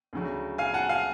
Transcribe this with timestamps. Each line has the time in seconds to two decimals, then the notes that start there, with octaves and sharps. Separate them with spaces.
0.13 D2 C#3 F#3
0.58 F5 G#5
0.74 F#5 A5
0.89 F5 G#5